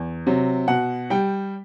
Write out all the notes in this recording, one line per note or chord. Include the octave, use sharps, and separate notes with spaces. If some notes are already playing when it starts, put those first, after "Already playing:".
Already playing: E2
C3 F#3
B2 F#5
G3 G5